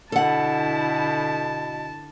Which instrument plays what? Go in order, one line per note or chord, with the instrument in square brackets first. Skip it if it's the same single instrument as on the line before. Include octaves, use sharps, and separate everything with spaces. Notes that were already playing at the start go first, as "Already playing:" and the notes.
[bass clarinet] B2 [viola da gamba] D3 E4 [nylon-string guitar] A4 F#5 [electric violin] A5